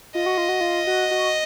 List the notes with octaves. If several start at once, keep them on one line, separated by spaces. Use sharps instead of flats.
F4 D#5
F#4
F4
F#4
F4
F#4
F#4